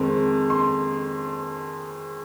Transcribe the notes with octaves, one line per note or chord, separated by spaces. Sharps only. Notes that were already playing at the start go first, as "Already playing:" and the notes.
Already playing: F2 D#3 G#3 C4
C6